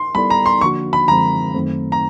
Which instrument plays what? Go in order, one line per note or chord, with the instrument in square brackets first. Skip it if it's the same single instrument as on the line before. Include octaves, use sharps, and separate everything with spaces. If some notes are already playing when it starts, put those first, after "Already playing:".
Already playing: [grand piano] C6
[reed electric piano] G3 B3 E4 A4 D5 [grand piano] B5
[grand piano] A#5
C6
[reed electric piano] D3 F3 A#3 D4 F#4 [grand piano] C#6
[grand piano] B5
[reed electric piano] F#2 D3 F3 G#3 C4 [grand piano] A#5
[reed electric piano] F#2 D#3 F#3 A3 C4
[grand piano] A#5